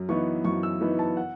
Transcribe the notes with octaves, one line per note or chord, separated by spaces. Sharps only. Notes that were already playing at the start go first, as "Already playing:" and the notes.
Already playing: F#2
E3 B3 D#4 C#6
F#2 C#6
E6
E3 B3 D#4
A5
F#5